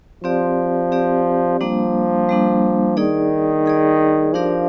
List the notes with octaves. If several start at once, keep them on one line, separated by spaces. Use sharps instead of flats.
F3 C4 G4 D5
C4 G4 D5
F3 G3 A#3 D4
G3 A#3 D4
D#3 D#4 G#4 D5
D#4 G#4 D5
F3 D4 G4 A#4 D5 F5